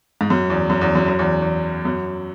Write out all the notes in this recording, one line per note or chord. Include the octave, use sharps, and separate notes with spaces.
G#2
F#2
E2
F#2
E2
F#2
F#2
E2
E2
F#2